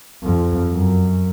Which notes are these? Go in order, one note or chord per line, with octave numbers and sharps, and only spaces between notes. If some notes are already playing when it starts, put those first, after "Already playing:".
F2
F#2